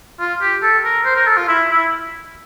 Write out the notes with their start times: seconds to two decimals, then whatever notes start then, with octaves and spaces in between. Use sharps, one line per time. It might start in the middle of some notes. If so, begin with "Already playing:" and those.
0.20 F4
0.41 G4
0.62 A4
0.84 A#4
1.05 C5
1.16 A#4
1.27 A4
1.37 F4
1.48 E4
1.69 E4